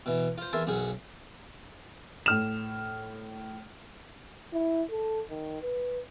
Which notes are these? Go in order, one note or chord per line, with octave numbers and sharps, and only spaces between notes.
B2 E3
F4 C5
E2 A#4 E5 G#5 A5 C6
B1 F#2 C#4 G#4 F#5
A2 F6 E7
E4
A4
D#3
B4